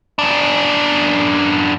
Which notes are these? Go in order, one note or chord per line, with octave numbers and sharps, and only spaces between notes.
F#2 D4